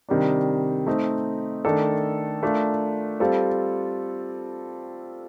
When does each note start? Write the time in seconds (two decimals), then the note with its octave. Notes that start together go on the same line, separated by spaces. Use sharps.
0.09 C3 D#3 G3 D4
0.87 A3 C4 D#4
1.65 D#3 A3 D4 A4
2.43 A3 D4 F4 A#4
3.20 G3 C4 F4 A4